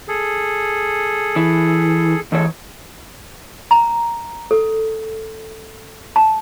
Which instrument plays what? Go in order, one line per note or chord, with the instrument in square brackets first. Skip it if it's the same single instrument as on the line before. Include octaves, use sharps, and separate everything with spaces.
[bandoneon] G#4 A4
[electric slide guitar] E3
[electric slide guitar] E2 E3 C#5 [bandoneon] G#3 A4
[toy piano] A#5
A4
A5